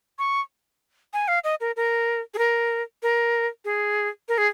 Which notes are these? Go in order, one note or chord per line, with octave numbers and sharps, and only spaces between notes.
C#6
G#5
F5
D#5
A#4
A#4
G#4
A#4
A#4
G#4
A#4
G#4